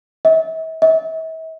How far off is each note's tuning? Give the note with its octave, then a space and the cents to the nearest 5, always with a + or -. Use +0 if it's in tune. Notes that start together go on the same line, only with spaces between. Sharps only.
E5 -40
E5 -40